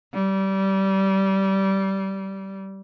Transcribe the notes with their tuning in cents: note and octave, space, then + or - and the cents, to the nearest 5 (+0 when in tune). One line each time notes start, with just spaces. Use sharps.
G3 -20